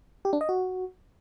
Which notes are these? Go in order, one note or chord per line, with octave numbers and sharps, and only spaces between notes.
G4
D4
D#5
F#4